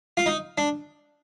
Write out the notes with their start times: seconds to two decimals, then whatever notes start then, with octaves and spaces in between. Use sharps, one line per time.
0.17 F4
0.26 D#4
0.58 D4